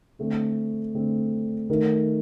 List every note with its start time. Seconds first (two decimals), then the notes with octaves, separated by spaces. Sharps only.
0.19 D3 A3 C4
0.94 D3 A3 C4
1.69 D#3 A3 D#4 A#4